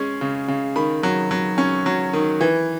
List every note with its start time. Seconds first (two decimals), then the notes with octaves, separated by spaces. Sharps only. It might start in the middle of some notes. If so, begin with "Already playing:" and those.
Already playing: G#3 C#4
0.21 C#3
0.48 C#3
0.76 D#3 B5
1.03 F#3
1.31 F#3
1.58 C#4
1.86 F#3
2.13 D#3
2.41 E3